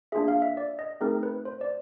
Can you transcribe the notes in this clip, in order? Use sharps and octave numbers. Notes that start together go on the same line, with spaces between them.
A#3 D4 F4 G#4 E5
F5
E5
D5
D#5
A3 C4 D#4 G#4 A#4
B4
C5
D5